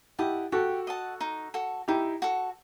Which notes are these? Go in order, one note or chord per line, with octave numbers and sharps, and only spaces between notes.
E4 G4 D#5 F#5 A5
F#4 G4 A4
D#5 F#5 A5
D#4
F#4 A4
D#4 E4 G4
F#4 A4